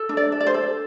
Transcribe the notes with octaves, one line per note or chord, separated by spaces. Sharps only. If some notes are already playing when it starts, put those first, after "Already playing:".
Already playing: A4
D4
D5
A4
D5
C5
A4